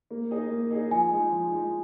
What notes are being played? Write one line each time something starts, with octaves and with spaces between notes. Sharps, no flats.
A#3
D#4 G#4 D#5
A#3
D#4 G#4 D#5
F3 G#5
G#3 D#4
F3
G#3 D#4